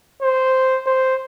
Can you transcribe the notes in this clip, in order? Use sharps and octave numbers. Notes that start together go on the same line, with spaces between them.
C5
C5